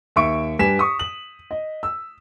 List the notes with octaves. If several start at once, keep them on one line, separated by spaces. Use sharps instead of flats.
D#2 E5 C#6 D7
G2 G4 B4 G#5 B6 E7
C#6 D#6
F#7
D#5
E6